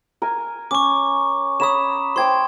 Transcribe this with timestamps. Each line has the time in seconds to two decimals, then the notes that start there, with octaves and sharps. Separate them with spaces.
0.22 A#4 G#5
0.71 C#4 C#6 D6
1.60 C#5 A#5 B5 D#6 E7
2.16 C5 G5 C6 D6 G#6